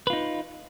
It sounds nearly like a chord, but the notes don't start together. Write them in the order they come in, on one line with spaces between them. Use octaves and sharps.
B4 F4 D#4